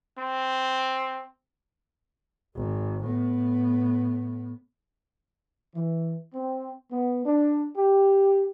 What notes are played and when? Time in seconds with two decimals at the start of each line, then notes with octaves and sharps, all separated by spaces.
0.19 C4
2.55 G#1
3.04 A2 B3
5.75 E3
6.34 C4
6.92 B3
7.26 D4
7.76 G4